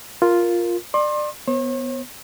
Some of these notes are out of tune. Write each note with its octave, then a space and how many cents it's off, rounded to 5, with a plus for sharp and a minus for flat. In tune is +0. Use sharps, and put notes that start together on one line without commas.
F4 +0 A#4 +0
D5 +25 C6 +30
B3 +0 C#5 -45